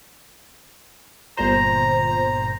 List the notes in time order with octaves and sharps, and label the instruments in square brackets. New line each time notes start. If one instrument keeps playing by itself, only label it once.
[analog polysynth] G1 A#2 C5 [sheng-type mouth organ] A#5